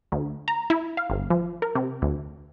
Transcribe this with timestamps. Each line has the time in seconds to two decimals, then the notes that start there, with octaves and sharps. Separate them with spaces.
0.12 D2
0.48 A#5
0.70 E4
0.97 F5
1.10 G1
1.30 F3
1.62 A#4
1.75 C3
2.02 D2